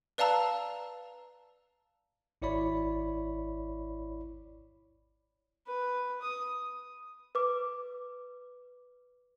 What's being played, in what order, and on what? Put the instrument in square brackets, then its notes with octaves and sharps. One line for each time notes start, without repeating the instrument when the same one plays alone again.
[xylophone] B4 D5 F5 A5 A#5 E6
[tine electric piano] G#1 E4 C#5 D5 B5
[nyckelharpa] B4
D#6
[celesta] B4 D6